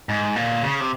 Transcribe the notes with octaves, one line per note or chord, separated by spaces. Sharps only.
G#2
A#2
C#3
C3